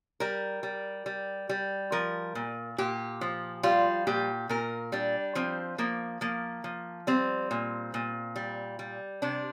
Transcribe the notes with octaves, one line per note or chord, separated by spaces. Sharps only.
G3 A#4
G3
G3
G3
F3 A#4
A#2
A#2 G4
F3
G3 F4
A#2 G4
A#2 A#4
G3 D4
F3 C4
F3 A#3
F3 A#3
F3
G3 C4
A#2
A#2
G3
G3
C3 D4